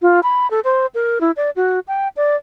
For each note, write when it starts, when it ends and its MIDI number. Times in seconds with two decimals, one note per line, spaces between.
0.02 0.20 65
0.23 0.50 83
0.50 0.60 69
0.64 0.86 72
0.94 1.19 70
1.21 1.31 64
1.36 1.50 74
1.56 1.79 66
1.88 2.08 79
2.17 2.36 74